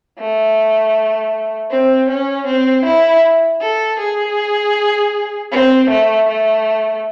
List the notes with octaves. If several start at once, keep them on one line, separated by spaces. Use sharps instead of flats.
A3
C4
C#4
C4
E4
A4
G#4
C4
A3
A3